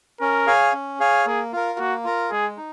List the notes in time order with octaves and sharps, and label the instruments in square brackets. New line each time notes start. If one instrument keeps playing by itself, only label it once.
[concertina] C#4 [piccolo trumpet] A#4
[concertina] G#4 C#5 F5 G#5
C#4
G#4 C#5 F5 G#5
[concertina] A#3 [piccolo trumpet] G#4
[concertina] F4 A#4
[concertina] A#3 [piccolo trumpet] F#4
[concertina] F4 A#4
[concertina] G#3 [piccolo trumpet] G#4
[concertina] D#4